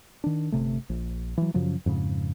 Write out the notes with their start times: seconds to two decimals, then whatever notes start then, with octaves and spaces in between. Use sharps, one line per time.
0.24 D#3 D4
0.52 G1 C3 A3
0.89 A#1
1.37 E3 F#3
1.54 F#2 C#3 F3 F#3
1.86 F2 G#2 C#3